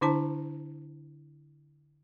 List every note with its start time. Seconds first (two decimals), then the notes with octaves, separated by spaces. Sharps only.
0.01 D3 D4 E4 C5 A5 A#5